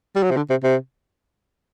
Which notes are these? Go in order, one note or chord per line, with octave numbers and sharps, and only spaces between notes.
G3
F#3
C3
D3
C3
C3